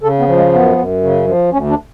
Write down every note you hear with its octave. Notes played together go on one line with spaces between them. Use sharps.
C#3 A4
B3
F3
G#3
F#2 B3
F#2
C#3
F3
D2 C#4
D4